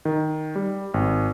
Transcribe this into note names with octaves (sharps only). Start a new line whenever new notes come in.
D#3
G3
G#1